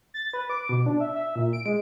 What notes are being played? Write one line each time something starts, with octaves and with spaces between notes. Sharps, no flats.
A6
B4
D6
B2
D4
E5
E5
A#2
D7
G#3